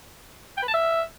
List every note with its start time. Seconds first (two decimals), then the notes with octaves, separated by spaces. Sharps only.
0.57 G5
0.62 B4
0.68 A5
0.73 E5